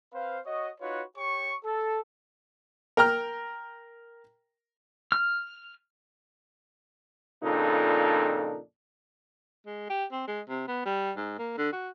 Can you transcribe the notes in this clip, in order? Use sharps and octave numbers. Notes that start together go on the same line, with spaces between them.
C4 B4 C5 F5
F#4 C#5 D#5
D#4 F4 F#4 B4 C#5
G4 C#5 C#6
A4
A#4 G5 A#5 F6
F6
F2 A#2 C#3 D4 D#4 A4
G#3
G4
C4
G#3
C3
B3
G3
G#2
A#3
D3
F#4